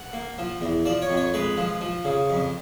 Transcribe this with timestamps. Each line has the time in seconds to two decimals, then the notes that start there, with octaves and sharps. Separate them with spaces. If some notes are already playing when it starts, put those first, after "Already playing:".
Already playing: F#5
0.13 A#3
0.38 F3
0.61 E2
0.85 F3 D5
1.02 C#5
1.10 F2
1.17 C#5
1.34 G#3 B4
1.57 F3
1.81 F3
2.05 C#3
2.30 F2